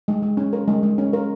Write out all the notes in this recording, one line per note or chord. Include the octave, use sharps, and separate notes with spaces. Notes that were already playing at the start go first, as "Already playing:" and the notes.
G#3
G#3
C#4
A#4
G#3
G#3
C#4
A#4